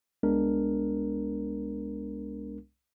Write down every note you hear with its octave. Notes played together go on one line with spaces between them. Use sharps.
C2 G#3 B3 D4 A#4